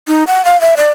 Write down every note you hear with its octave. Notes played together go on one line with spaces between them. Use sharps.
D#4
F#5
F5
E5
D5